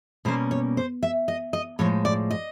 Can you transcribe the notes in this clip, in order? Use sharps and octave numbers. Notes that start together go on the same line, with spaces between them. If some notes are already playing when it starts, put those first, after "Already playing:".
B2 G3 A#3 C#4 C5
C#5
C5
E5
D#5
D#5
A2 F3 G#3 C#5
D5
D#5